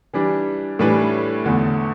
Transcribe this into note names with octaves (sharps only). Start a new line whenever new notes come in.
E3 G3 D4
A2 E3 G3 D4 B4
E2 D3 A3